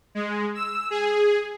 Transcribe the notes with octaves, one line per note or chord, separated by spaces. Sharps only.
G#3
E6
G#4